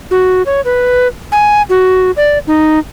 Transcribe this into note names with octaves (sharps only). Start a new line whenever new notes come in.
F#4
C#5
B4
G#5
F#4
D5
D#4